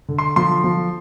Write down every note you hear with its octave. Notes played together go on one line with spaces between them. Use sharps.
D3
C6
F3 C6
F3